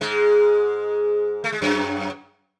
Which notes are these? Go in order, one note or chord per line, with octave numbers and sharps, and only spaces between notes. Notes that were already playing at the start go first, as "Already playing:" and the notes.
G#2 G#3
A3
G#3
F#2 F#3